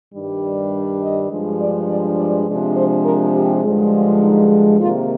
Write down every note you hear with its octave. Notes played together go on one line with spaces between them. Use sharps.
G2 D#3 G3 D4
D#5
G2 F3 G#3 D4
D5
D5
D5
C3 F3 G#3 D4
C5
A#4
G4
G2 D3 F3 G#3
F4
D#4
C3 D#3 A#3 F4